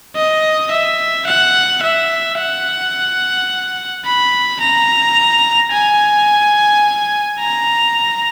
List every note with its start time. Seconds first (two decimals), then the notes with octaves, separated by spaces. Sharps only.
0.16 D#5
0.71 E5
1.27 F#5
1.82 E5
2.39 F#5
4.05 B5
4.60 A#5
5.72 G#5
7.40 A#5